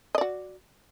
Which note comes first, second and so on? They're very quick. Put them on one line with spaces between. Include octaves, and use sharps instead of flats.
D#5 D5 F#4